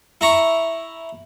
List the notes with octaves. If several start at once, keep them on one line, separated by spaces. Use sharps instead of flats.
E4 A#5 C#6